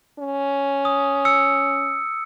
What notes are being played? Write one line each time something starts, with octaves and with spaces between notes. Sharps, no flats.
C#4
D#6
E6 C#7